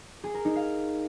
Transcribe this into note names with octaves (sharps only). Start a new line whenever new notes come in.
G#4
A#4
D#4
F5